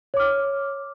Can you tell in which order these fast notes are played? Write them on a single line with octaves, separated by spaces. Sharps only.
C#5 D6 F6